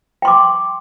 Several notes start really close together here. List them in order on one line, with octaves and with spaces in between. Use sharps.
G5 C6 D6